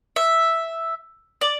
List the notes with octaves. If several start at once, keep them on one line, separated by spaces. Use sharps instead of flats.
E5
D5